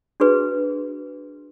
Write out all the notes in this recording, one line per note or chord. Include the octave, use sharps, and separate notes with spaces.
D4 F#4 G#4 B4